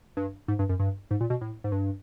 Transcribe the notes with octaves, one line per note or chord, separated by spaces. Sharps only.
G2
G#2
G2
F#2
G2
G#2
A#2
B2
A2
G#2
G2